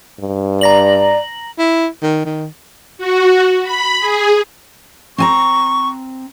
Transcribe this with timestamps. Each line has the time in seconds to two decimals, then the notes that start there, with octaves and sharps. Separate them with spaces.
0.20 G2
0.61 D5 A#5 A#6 F#7
1.59 E4
2.03 D#3
2.25 D#3
2.98 F#4
3.63 B5
4.00 G#4
5.18 C4 G#5 A#5 C#6